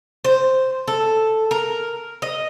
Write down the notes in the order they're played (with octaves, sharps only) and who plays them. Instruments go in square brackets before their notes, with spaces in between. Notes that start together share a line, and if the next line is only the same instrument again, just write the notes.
[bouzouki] C5
A4
A#4
D#5